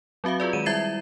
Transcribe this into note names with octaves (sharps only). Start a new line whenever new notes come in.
F#3 C4 F#4 E5 F5
F4 G#4 B4 D5
D#3 G#3 D#7 E7
G3 E4 E5 G#6 A6 C7